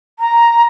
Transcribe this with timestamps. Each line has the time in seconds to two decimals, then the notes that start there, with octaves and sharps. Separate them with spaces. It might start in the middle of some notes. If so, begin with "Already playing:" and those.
0.19 A#5